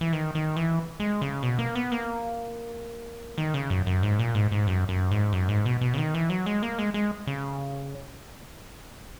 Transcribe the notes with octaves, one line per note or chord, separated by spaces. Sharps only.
E3
D#3
D#3
E3
G#3
C#3
B2
A#3
B3
A#3
D#3
C#3
F#2
F#2
G#2
A#2
G#2
G#2
F#2
F#2
G#2
F#2
G#2
B2
B2
C#3
D#3
E3
F#3
G#3
A#3
G#3
G#3
C#3